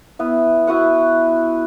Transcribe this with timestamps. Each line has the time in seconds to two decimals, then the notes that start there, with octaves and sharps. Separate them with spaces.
0.19 B3 E4
0.67 E4 F#4 B4 F#5